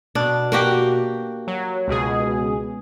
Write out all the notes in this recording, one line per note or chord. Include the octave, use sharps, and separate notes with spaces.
B2 D4
A#3 F#4 G4
F#3
C#2 B2 G#4